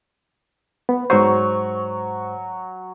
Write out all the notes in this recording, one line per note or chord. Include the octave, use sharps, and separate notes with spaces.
B3
G#2 F#3 C5 C#6